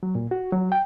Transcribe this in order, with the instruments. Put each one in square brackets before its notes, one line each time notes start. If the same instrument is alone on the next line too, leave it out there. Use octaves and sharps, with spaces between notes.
[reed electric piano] F#3
A#2
F#4
F#3
G5